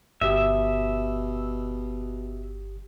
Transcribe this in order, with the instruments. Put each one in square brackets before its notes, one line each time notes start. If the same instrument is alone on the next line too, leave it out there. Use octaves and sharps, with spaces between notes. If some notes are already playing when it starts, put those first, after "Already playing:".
[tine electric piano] G1 G4 D#6 [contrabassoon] B2 [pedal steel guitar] E5